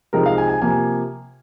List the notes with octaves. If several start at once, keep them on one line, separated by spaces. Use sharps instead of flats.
C3 F3 G#3 C4 D#4 A#4
F5
G#5
G#5
C3 F3 A#3 G#5